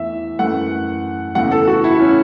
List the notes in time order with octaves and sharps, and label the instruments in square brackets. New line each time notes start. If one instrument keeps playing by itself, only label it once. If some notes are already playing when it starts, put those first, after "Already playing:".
Already playing: [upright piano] E2 E3 A3 E5
F#2 E3 A3 F#5
E2 C#3 E3 A3 F#5
A4
F#4
E4
C#4